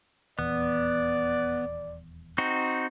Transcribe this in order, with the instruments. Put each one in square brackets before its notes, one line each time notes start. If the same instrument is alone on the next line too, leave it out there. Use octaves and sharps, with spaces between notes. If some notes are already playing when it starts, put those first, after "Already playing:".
[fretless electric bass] D#1 E2 [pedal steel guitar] B3 [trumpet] D5
[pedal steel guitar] C4 D#4 F#4